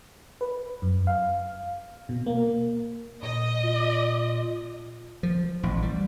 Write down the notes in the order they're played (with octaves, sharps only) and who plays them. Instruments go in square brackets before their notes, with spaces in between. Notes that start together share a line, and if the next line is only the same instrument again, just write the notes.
[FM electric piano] B4
F#2
F5
B2
A#3
[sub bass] A#2 [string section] D#5
[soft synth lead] F4
[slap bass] F3
A1
G3